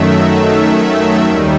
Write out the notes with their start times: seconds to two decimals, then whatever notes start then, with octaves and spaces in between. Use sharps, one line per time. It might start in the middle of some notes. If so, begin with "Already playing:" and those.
Already playing: F#2 D#3 F#3 A3 E5
1.25 D#2 D#3 G3